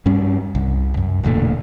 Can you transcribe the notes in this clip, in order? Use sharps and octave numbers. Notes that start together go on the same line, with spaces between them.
G2 G3 C#4
C2
F#2
E1 D2 A#2 A3